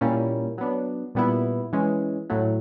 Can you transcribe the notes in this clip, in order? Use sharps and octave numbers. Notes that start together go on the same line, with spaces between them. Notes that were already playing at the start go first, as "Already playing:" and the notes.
A#2 G3 A#3 C#4 E4
F#3 B3 D4
A#2 G3 B3 E4
E3 G#3 C#4
A2 F#3 A3